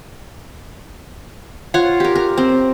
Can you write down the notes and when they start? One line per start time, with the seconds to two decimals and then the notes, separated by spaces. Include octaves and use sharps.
1.74 F4 C#5 F#5
2.00 G4 A#4
2.15 A#4
2.38 C4